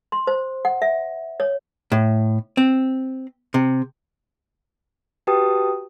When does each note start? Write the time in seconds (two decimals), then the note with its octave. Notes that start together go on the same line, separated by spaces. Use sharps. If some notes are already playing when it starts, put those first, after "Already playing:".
0.12 C6
0.27 C5
0.65 F#5
0.82 E5
1.40 C#5
1.92 A2
2.57 C4
3.54 C3
5.27 F#4 G4 B4 G5 A5 D#6